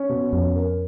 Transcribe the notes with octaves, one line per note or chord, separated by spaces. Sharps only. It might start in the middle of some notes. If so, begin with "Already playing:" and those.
Already playing: C#4
B2
F2 C#4
A#4